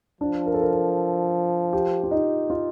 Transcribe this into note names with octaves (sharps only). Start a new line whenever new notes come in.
F3 D4
A#4
A4
A#4
A#4
G4
F4
D#4
F4